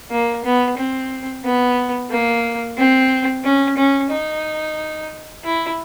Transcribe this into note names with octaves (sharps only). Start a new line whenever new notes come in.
A#3
B3
C4
B3
A#3
C4
C#4
C#4
D#4
E4